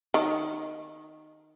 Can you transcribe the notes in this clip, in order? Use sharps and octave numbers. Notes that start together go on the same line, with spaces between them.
D#3